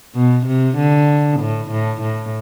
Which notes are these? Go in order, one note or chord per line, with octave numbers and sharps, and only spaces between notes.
B2
C3
D3
A2
A2
A2